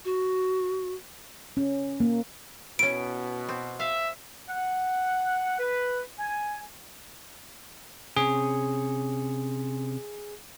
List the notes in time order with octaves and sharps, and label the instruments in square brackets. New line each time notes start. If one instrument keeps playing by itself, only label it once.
[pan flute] F#4
[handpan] C#4
A#3
[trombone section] B2 [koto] C#4 E4 [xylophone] D7
[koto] C4
[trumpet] E5 [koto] F5
[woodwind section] F#5
B4
G#5
[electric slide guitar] C3 C#4 [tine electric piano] G#4